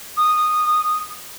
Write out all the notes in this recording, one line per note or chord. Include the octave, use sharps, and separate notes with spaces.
D#6